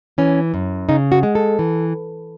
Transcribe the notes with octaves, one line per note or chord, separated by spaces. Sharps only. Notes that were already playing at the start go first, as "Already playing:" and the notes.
E3 C#4
F#2
C#3 D#4
F#4
G#3
A4
E3